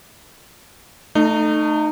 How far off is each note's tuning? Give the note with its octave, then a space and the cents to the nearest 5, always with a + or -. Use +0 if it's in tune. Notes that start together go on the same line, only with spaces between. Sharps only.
A3 +10 D#4 -25